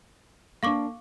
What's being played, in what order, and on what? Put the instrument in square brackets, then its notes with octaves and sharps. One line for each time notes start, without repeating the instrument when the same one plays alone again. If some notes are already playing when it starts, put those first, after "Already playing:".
[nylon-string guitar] A#3 D4 [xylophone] F5 C#6 D6